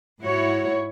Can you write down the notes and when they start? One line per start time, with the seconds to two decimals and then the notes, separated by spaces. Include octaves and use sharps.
0.21 G#2 E4 F#4 C#5